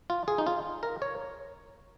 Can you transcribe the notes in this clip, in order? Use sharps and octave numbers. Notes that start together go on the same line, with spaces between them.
F4
G#4
D#4
F4
A#4
C#5